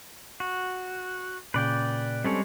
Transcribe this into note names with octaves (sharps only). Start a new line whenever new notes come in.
F#4
A#2 C#3 B4 D5 G5
G3 G#3 C4 C#4 A4 C#5